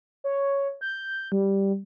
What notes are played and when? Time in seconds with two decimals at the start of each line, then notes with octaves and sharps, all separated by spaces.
0.24 C#5
0.81 G6
1.32 G3